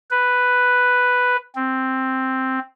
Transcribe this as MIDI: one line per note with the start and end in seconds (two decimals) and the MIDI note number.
0.11 1.37 71
1.55 2.59 60